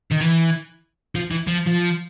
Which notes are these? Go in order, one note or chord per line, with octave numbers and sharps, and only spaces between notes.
D#3
E3
F3
E3
F3
F3